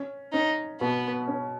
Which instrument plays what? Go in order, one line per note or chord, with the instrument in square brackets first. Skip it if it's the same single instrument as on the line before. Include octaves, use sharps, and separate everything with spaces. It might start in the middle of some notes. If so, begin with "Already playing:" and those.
Already playing: [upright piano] C#4
[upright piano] C#4 [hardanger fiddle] D#4
[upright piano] B2 [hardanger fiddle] B3
[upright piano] C#4